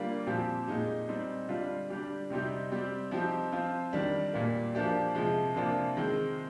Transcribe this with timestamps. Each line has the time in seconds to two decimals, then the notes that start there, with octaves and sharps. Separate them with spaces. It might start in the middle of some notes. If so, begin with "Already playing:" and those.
Already playing: D3 G3 A#3 F4
0.27 A#2 F3 C4 G4
0.68 A#2 G#3 D#4 G4
1.08 G3 C4 D#4
1.48 D3 G3 D4 F4
1.90 D3 G3 D4 G4
2.30 C3 G3 C4 D#4 G4
2.72 G3 C4 G4
3.11 F3 C4 D#4 G4
3.52 F3 C4 F4
3.93 D#3 G3 D4
4.33 A#2 G3 A#3
4.75 F3 A#3 D4 G4
5.15 C3 F3 G#3
5.56 C3 F3 A#3 D4 F4
5.97 D#3 G#3 C4